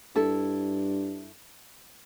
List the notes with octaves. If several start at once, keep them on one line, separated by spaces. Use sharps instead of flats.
G2 E4 A4